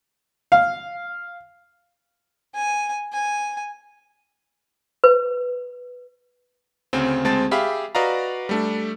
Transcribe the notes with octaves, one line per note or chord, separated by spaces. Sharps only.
F5
G#5
G#5
B4
D2 C#3 C4
D2 G#3 C4 A5 A6
G4 G#4 E5 F5 B5
F#4 B4 D5 D#5 F5 A#5
G3 A3 D4